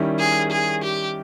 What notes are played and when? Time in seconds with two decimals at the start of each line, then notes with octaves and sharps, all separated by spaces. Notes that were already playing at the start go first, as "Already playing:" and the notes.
Already playing: D#3 G3 C#4 E4
0.19 G#4
0.52 G#4
0.84 G4